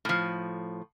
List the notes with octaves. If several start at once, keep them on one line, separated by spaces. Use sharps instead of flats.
A2 F3